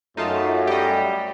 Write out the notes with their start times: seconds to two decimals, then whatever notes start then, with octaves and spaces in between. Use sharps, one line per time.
0.17 F#2 A3 D#4 F4 A5
0.67 G3 G4 D#5